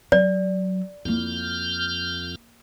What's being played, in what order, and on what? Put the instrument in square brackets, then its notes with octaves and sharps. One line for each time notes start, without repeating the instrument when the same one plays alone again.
[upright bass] F#3 [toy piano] D5
[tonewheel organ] F2 F6 G6 [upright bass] A#3 E4